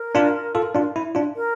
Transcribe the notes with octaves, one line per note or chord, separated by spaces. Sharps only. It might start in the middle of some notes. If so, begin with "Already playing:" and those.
Already playing: A#4
D4 F4
F4 A4
D4 F4
E4
D4 F4
A#4